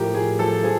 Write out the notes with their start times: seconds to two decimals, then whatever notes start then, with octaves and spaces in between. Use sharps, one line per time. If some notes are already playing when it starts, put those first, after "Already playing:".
Already playing: A2 F3 G4 A#4
0.14 A2 G#4
0.39 F3 A4
0.64 F3 G#4